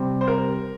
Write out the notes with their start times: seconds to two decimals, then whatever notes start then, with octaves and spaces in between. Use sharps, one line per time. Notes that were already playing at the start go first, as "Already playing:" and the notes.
Already playing: C3 G3 C4
0.21 C5
0.27 A#4